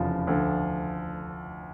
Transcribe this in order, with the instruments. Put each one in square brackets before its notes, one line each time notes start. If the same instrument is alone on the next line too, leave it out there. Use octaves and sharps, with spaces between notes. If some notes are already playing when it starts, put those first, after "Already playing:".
Already playing: [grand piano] F1 E2 C#3 F3 F4
D2 D3 F3